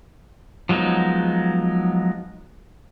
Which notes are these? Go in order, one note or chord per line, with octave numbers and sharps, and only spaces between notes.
F3 F#3 G#3 B3 D#4